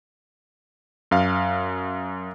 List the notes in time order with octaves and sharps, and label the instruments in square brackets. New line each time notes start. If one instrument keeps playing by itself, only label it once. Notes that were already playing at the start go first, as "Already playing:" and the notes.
[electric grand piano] F#2 F5